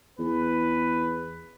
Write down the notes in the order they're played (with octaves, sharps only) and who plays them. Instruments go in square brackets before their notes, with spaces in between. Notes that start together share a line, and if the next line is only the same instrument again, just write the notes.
[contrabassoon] E2 [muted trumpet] B4